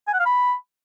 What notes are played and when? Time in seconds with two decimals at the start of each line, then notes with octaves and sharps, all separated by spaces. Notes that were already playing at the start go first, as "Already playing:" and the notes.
0.07 G#5
0.13 F#5
0.20 F5
0.26 B5